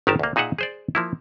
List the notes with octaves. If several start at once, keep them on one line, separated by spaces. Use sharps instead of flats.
G1 D#3 G4 A#4 A5
D2 A#3
A#2 D#4 G#4 E5 F#5
G#4 C5 D5
F3 A#3 E4